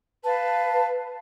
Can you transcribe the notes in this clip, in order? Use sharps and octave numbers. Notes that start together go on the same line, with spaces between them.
B4 F5 A5